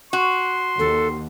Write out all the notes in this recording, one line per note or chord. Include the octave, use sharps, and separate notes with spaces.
F#4 C6
D#2 A4